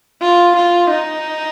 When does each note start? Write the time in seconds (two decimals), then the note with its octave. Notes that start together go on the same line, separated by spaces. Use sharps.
0.22 F4
0.56 F4
0.90 D#4